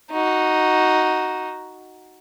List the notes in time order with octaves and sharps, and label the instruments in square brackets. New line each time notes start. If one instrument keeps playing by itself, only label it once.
[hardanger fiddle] D#4 F#4